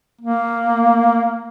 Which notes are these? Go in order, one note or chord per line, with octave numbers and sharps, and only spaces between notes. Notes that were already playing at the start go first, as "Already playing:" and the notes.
A#3